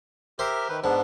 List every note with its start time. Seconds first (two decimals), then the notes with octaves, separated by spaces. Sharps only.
0.39 G4 A#4 C5 E5
0.69 D#3 B4
0.84 G#2 B3 D4